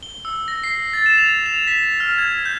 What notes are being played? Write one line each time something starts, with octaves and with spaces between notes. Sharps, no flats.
G7
E6
A#6
C7
A6
E7
F7
F7
B6
F6
G#6
G6